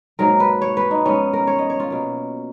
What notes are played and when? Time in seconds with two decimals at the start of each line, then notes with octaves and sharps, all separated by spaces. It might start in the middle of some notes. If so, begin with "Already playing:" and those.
0.19 G#2 F#3 A#3 A#4
0.40 B4
0.61 C#5
0.77 B4
0.91 D#4
1.05 G#2 F3 B3 C#4
1.33 A#4
1.47 C#5
1.59 D#5
1.70 C#5
1.80 F4
1.90 B2 F#3 A#3